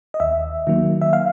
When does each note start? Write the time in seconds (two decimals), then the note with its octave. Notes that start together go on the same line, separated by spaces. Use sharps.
0.14 D#5
0.20 D#2 E5
0.67 D#3 F#3 A#3
1.01 E5
1.13 F5